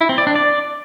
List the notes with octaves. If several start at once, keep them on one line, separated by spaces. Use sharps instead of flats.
E4
C4
D5
D4
D5